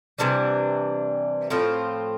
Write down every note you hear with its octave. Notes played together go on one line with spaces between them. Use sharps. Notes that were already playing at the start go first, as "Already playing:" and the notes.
C3 E3 G3 D4
A2 F3 C4 F4